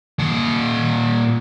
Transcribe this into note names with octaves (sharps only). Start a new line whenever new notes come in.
A#2 F#5